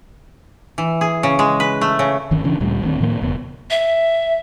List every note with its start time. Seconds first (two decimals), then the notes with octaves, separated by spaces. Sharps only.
0.78 E3
1.01 G#4
1.23 C#3
1.39 G#3
1.60 B4
1.81 A3
1.99 C#3
2.31 G1 D#3 C#4
2.44 C#3 E3 C#4 D4
2.60 D1 D2 A#2 G3
2.82 D1 D2 D#3 C4
3.00 A2 D#3 F3 A#3
3.22 E1 E2 C#3 B3
3.70 E5